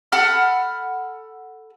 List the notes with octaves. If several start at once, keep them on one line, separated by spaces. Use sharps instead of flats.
A4 F#5 B5 F6